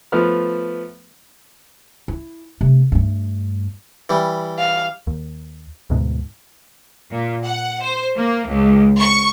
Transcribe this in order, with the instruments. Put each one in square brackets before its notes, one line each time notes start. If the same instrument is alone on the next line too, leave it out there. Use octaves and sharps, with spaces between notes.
[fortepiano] F3 A3 B3 F6
[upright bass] E4
C3 A3
G2 A3
[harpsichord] E3 G3
[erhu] F5
[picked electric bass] D#2
D2 G#2 B2
[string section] A#2
F#5
C5
A#3
C#2
C#6